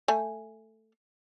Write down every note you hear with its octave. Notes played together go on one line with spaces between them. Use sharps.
A3 G#5